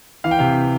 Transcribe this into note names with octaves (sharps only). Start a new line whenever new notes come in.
E3 F5
G5
C3 F5